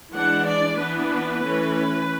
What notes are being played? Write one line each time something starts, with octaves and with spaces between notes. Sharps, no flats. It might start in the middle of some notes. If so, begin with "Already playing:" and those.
E3 G#3 D4 F#5
D5
E3 B3 D4 B4
E3 A3 C#4